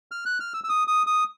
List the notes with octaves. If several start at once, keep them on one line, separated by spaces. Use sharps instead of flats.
F6
F#6
F6
E6
E6
D#6
D#6
D#6